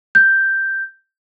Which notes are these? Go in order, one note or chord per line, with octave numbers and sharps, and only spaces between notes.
G6